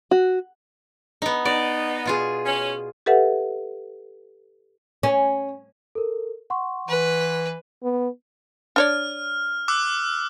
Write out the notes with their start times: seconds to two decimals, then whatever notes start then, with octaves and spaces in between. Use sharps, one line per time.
0.11 F#4
1.22 B3 D#4
1.45 B3 D#4 D5
2.06 B2 F4 G#4
2.46 C#4
3.06 G4 A4 B4 E5 F#5
5.03 C#4
5.95 A4 A#4
6.50 F#5 C6 C#6
6.88 E3 B4
7.83 B3
8.76 D4 C#5 D5 F6
9.68 D6 E6 F#6